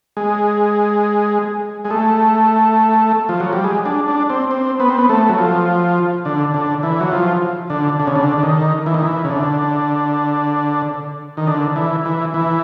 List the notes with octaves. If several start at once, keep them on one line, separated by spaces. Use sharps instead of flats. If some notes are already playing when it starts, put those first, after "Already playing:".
G#3
G#3
A3
F3
F#3
G3
G#3
D4
D4
C4
C4
B3
C4
B3
A3
F#3
F3
D3
D3
E3
F#3
F3
D3
D3
C#3
D3
D3
D#3
E3
D#3
E3
C#3
D3
D#3
D3
E3
E3
E3